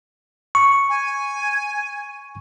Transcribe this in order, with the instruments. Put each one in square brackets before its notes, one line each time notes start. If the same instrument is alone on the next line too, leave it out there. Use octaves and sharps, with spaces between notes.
[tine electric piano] C#6
[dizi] G#5